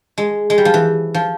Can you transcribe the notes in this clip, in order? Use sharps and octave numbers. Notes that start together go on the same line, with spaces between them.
G#3
G#3
G3
F3
E3
F3